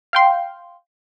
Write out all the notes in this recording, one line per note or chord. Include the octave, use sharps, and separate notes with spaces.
F5 G5 C6